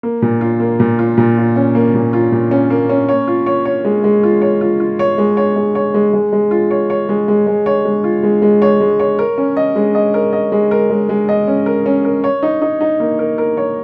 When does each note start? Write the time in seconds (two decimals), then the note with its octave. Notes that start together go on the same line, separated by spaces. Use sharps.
0.03 A#3
0.22 A#2
0.41 F4
0.60 A#3
0.80 A#2
0.99 F4
1.17 A#2
1.37 F4
1.56 C#4
1.75 A#3
1.94 A#2
2.13 F4
2.32 A#2
2.51 C#4
2.70 A#3
2.89 C#4
3.09 C#5
3.27 F4
3.46 C#5
3.65 C#5
3.85 G#3
4.04 G#3
4.23 F4
4.42 C#5
4.61 F4
4.80 F4
4.99 C#5
5.18 G#3
5.37 C#5
5.56 G#3
5.75 C#5
5.94 G#3
6.14 G#3
6.33 G#3
6.51 F4
6.71 C#5
6.90 C#5
7.09 G#3
7.28 G#3
7.47 G#3
7.66 C#5
7.85 G#3
8.04 F4
8.23 G#3
8.42 G#3
8.62 C#5
8.80 G#3
9.00 C#5
9.19 A#4
9.38 C#4
9.57 D#5
9.76 G#3
9.95 D#5
10.14 A#4
10.33 D#5
10.52 G#3
10.71 A#4
10.90 G#3
11.09 G#3
11.29 D#5
11.48 C#4
11.66 A#4
11.86 C#4
12.05 A#4
12.24 C#5
12.43 D#4
12.62 D#4
12.81 D#4
13.00 A#3
13.19 A#4
13.38 A#4
13.57 C#5